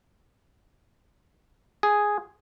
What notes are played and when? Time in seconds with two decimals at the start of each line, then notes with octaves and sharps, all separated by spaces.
1.83 G#4